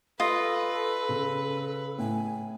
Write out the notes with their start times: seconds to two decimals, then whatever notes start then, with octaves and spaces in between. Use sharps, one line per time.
0.20 F4 A4 B4 D#5
1.09 C#3
1.98 A2 G#5